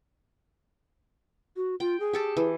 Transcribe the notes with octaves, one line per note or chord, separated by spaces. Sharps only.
F#4
F4 G5
G#4
G4 A4 A5
E3